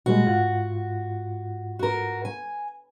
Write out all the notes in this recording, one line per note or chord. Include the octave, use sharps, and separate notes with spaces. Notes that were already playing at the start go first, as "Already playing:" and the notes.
A#2 G3 G#3 F#4
G#2 F4 F#5
F#4 A#4
G#5